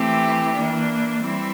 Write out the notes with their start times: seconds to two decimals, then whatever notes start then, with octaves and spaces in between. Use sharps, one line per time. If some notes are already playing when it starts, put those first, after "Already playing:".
Already playing: E3 A3 C4 G4
0.55 E3 A#3 D4
1.22 E3 G3 C4 E4